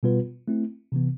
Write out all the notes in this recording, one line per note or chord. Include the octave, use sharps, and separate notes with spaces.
B2 G3 B3 F4 B4
A3 C4 E4
C3 E3 B3